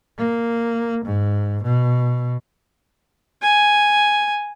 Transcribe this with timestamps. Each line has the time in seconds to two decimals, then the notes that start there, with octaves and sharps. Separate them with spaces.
0.18 A#3
1.06 G#2
1.63 B2
3.42 G#5